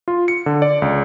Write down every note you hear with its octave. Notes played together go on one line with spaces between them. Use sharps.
F4
C#7
D3
D5
C#2